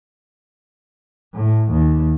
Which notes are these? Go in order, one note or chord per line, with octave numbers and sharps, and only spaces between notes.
A2
D#2